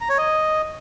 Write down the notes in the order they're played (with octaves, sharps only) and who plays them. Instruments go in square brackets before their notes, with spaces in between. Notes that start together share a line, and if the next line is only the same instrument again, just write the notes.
[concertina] A#5
C#5
D#5